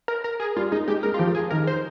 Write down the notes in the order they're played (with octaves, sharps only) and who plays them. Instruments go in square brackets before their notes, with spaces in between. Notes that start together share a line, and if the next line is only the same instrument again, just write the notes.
[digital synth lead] A#4
A#4
G#4
[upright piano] G3 [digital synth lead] F4
[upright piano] G#3 [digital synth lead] D#4
[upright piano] G#3 [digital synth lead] G4
[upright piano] G#3 [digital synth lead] A#4
[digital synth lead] F4
[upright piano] F3 [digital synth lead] G4
[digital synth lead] G#4
[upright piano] D#3 [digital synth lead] A#4
[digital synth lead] C5